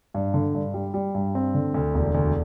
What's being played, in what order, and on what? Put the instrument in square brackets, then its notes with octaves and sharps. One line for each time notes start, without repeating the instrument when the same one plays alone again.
[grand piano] G2
D3
G2
G3
G3
G2
C4
D3
D2
E1
D2